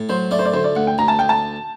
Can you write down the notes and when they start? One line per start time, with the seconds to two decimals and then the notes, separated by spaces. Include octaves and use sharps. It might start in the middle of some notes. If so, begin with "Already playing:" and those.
Already playing: A2
0.09 F#3 C5
0.31 A3 D5
0.39 C5
0.45 D5
0.53 D2 C5
0.64 D5
0.75 D2 F#5
0.87 G5
0.98 D2 A#5
1.08 A5
1.19 D2 G5
1.29 A5